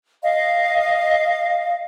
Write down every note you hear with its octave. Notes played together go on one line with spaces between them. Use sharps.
D#5 F5